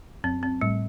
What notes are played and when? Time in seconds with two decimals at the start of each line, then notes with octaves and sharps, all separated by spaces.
0.24 F#2 C4
0.43 C4
0.61 A2 G3